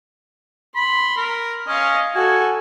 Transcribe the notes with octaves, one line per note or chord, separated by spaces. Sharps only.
B5 C6
A#4
C#4 D#5 F5
F#4 A4 G#5